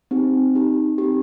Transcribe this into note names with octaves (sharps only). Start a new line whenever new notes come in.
C4 D#4 G4
C4 D#4 G4
C4 D#4 G4